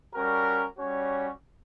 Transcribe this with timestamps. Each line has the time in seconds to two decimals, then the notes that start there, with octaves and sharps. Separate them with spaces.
0.14 G3 C#4 F#4 A#4
0.78 G3 C#4 F#4 C#5